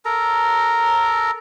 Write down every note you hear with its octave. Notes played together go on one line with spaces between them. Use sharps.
A4 A#4 A#5